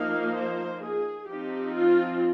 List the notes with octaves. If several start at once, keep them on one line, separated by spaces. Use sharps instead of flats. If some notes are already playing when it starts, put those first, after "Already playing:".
Already playing: F3 A#3 D#4 F5
C5
G#4
F3 C4 D#4 G4
F4